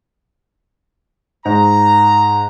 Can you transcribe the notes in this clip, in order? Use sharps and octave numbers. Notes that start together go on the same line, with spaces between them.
G#2 A#5